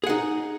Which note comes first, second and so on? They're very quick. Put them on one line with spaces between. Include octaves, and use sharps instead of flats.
G#4 F#5 D#4